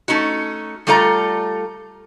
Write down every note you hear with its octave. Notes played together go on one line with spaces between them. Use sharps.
A3 C#4 D#4 F#4
G3 A3 F4 A4 D5 A#5